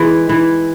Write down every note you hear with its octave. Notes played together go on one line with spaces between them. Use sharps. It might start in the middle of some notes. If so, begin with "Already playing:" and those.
Already playing: E3 G#3
E3